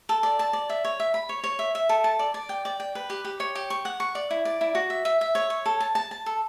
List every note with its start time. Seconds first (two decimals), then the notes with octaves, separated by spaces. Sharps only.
0.09 A4
0.23 D5
0.39 A5
0.53 D5
0.70 E5
0.85 C#5
1.00 E5
1.14 B5
1.29 C#5
1.44 C#5
1.59 E5
1.75 E5
1.89 A4
2.04 A5
2.19 D5
2.34 D5
2.49 G5
2.65 D5
2.80 G5
2.95 B4
3.10 G4
3.25 G4
3.40 C#5
3.55 G4
3.70 C#6
3.85 F#5
4.00 C#6
4.15 D5
4.30 E4
4.45 D5
4.61 E4
4.75 F#4
4.90 E5
5.05 E5
5.21 E5
5.35 C#5
5.50 C#5
5.66 A4
5.80 A5
5.95 A5
6.11 A5
6.26 A4